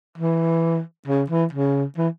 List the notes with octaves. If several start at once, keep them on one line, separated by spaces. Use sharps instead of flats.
E3
C#3
E3
C#3
E3